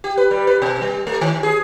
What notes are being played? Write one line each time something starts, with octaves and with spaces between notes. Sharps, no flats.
G4
B4
G3
B4
B2
G3
A3
D#3
G#4